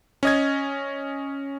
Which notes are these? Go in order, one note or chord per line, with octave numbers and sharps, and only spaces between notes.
C#4 D#5 G#6